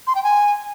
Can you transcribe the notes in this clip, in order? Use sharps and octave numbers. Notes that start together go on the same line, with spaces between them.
C6
G5
G#5